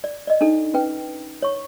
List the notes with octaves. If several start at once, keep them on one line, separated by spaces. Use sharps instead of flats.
D5
D5 D#5
D4 D#4 A4
C#4 B4 G5
C#5 C#6